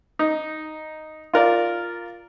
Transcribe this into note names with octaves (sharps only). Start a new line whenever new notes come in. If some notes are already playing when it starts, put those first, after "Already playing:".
D#4
F4 A#4 D5